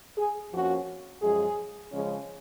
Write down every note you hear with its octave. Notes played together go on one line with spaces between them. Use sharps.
G#4
F2 F3 A#3 C#4 F#4
F#2 F3 G#3 G#4
C#3 F3 G#3 C#4